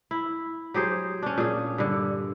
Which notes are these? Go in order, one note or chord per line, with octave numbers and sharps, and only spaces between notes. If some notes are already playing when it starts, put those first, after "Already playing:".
E4
F#3 G4 G#4 C5
C#4 D4
A#2 G#4
G2 D3